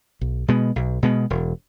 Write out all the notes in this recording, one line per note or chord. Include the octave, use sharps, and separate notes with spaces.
B1
B2 G#3 B3
B1
B2 G#3 B3
E1